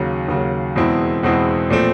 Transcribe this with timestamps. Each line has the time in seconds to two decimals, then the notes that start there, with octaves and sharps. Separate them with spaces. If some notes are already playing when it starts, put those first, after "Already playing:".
Already playing: D#2 C#3 F#3
0.28 D#2 C#3 F#3
0.76 E2 B2 G#3 C4 E4
1.23 E2 B2 G#3 C4 E4
1.70 A#2 F3 A3 C4